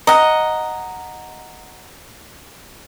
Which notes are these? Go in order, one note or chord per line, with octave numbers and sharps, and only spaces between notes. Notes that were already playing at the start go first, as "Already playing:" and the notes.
D#5 F#5 A#5